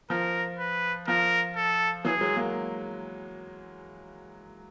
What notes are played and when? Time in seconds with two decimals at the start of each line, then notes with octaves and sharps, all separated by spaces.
0.10 F3 A#4
0.59 B4
1.08 F3 A#4
1.56 A4
2.05 E3 F#3 G#4
2.21 F#3 G#3
2.36 G#3 A#3